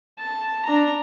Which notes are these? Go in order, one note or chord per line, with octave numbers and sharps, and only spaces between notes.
A5
D4 A#5